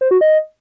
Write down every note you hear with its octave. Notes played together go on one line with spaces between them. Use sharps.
C5
F#4
D#5